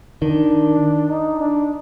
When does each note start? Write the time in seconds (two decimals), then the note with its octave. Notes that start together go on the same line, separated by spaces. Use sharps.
0.22 D#3 D4
1.10 D#4
1.40 D4